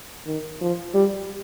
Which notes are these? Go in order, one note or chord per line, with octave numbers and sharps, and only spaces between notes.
D#3
F3
G3